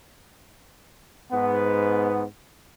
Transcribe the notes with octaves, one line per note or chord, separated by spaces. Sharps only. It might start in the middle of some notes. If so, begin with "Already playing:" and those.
G#2 B3